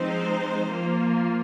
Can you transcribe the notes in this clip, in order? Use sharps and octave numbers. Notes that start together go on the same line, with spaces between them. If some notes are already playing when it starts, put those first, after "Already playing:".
Already playing: F3 G#3 C4 D#4 C5
F3 A#3 F4